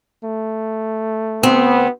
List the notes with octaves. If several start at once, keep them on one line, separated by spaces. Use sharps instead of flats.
A3
D2 B3 C4